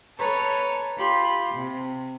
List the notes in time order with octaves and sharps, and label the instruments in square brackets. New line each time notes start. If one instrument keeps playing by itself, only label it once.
[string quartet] A4 B4 C#5 A5 A#5
F4 G4 B5 C6
C3